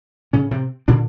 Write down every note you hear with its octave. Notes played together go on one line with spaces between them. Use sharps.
A2 C#3 C#4
C3 C4
A#2 D3 D4